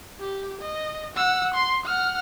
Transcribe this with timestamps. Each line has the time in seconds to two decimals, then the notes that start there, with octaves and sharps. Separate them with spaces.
0.20 G4
0.61 D#5
1.16 F#5 E6
1.54 C6
1.86 F#5 F6